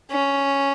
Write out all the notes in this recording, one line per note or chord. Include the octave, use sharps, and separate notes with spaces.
C#4